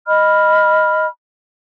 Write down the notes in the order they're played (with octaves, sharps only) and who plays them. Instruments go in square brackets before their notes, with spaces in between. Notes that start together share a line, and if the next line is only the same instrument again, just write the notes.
[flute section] D#5 B5 F6